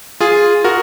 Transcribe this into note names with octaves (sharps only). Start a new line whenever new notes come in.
F4 G#4
F#4 A#4